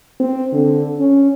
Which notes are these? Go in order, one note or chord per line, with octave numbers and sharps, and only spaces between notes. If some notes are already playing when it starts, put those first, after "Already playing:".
C4
D3
C#4